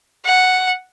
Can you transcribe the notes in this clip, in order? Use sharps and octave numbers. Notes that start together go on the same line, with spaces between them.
F#5